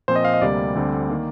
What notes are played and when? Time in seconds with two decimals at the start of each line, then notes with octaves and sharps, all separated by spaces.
0.08 A#2 F3 C4 C5
0.16 D#5
0.25 F5
0.34 D#5
0.41 D2 C3 G3 A#3 D5
0.75 D2 D3 G3 C4
1.09 D#3 A#3